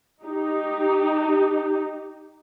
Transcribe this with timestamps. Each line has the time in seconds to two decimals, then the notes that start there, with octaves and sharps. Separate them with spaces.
0.24 D#4 G4